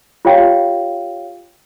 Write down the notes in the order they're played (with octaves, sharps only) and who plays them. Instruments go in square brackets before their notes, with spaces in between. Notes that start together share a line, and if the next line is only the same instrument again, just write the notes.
[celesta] F4 G4 C#5 F5 G5